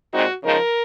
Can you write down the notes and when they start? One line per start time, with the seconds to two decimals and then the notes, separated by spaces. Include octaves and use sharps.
0.12 A#2 G#3 C4 D#4 F#4
0.44 C#3 F3 G#3 D#4 A#4